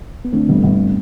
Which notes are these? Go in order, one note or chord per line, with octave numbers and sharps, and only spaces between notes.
B3
D3 A3 C4
G1 G3 B3
G1